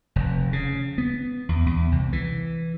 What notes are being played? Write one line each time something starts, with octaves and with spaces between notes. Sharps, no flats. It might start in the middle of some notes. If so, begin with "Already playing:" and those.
F1
C#3
B3
E2
E2
C2
E3